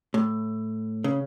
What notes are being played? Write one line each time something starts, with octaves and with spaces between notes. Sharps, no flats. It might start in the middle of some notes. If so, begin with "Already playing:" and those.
A2
C#3